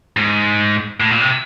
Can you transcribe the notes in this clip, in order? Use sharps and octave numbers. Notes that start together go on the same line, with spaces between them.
G#2
A2
A#2
C3